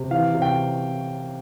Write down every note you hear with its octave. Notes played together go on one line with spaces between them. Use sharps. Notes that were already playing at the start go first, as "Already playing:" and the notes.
Already playing: C3
E3 F5
C3
G5